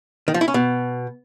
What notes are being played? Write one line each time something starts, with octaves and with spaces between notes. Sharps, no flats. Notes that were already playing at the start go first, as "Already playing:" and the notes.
D#3
F3
E4
C#4
B2